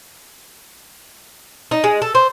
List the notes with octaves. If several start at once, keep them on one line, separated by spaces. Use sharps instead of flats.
D#4
G#3
A4
C5